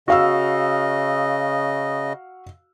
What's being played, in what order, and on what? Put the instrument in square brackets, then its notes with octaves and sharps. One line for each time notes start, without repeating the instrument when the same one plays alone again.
[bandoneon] C#3 D#5 [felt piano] F#4 F5 E6